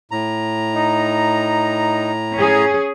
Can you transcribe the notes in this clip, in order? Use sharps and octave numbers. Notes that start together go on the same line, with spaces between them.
A2 A#5
D#4
C#4 G#4